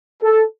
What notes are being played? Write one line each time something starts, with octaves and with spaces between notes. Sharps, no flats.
A4